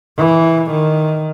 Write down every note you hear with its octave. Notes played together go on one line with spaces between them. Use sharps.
E3
D#3